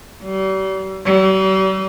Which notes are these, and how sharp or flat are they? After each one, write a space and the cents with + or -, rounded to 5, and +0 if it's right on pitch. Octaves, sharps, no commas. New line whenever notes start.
G3 -40
G3 -45